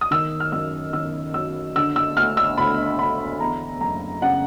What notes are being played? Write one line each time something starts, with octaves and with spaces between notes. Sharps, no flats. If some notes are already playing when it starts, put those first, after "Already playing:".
D#6
D#3 E6
F6
F#2 E6
D#3 E6
F#3 E6
D3 E6
E6
D2 F6
E6
D2 B5
D3 B5
E2 A#5
F#1 A#5
C#3 F#5